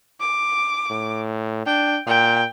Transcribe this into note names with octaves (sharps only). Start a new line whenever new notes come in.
D6
A2
D4 G5
A#2 G5